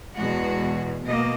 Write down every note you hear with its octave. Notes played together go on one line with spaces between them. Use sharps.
E2 B2 G#3 F#4
B2 A#3 D#5